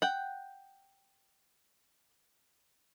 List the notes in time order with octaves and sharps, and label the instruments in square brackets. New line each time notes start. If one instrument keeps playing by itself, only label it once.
[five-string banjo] F#5 G5